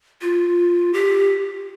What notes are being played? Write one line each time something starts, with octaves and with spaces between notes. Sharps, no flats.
F4
G4